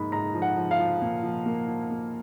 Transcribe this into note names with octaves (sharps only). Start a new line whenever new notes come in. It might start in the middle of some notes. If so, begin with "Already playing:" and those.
Already playing: G#2 F3 A#3 D#4 B5
G#2 A#5
F3
F#5
F3
F5
F3
A#2
F3
A#3
F3
A#3